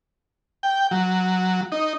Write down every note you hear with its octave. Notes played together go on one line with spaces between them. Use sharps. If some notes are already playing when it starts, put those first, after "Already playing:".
G5
F#3
D#4